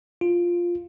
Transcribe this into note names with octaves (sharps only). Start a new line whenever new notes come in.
F4